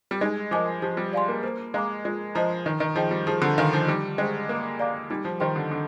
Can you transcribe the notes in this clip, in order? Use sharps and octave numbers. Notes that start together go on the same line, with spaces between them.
G3
G#3 D#4
F3 A#4 D#5 G#5 D6
F3 G4
G3
D5 F5 G#5 C6
A#3
A#3 C5
G#3 F5 A#5 D6
G#3 F4
F3 C5 D#5 A#5
D#3 D#4
D#3
F3 G#4 D#5 G5
G3
F3 G#4
D3
D#3 C5 F5 G#5 C6
F3
G3 D#4
G#3 G4 C5 G5
A#3 A#4
D5 F5 A#5 D6
G3 D#4
F3
D#3 G4 C5 G5 C6
D3
D3 D4